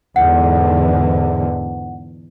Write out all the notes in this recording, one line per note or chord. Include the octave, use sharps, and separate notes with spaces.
E2 G#2 D3 F#5